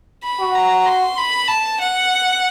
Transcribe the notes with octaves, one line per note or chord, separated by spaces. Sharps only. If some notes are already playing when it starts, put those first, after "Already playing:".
B5
F#4
A#5
C6
B5
A5
F#5